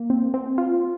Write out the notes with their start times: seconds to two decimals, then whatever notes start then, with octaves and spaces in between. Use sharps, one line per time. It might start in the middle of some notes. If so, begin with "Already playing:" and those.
Already playing: A#3
0.10 C4
0.34 C4
0.58 F4